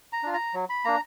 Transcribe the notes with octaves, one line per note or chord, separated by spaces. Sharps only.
A#5
D4 F4
A#5
F#3
B5
A#3 D4 A#5